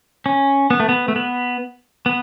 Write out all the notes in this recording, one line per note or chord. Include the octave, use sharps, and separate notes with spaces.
C#4
B3
A3
B3
A3
B3
B3